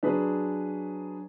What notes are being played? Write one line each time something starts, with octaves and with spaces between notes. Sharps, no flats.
F#3 D4 G#4 B4